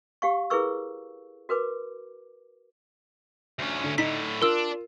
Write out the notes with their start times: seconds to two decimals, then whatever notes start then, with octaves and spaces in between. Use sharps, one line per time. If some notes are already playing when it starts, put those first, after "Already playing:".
0.22 G4 F5 C#6
0.50 E4 G#4 A#4 B4 C#6 E6
1.49 F#4 A#4 B4 D6
3.59 D2 C#4
3.84 D3
3.98 A2 D3 D#4 B6
4.42 D4 F4 A#4 E6